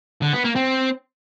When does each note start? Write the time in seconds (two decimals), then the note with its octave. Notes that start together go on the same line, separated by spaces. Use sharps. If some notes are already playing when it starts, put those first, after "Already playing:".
0.22 D3
0.33 B3
0.44 A#3
0.55 C4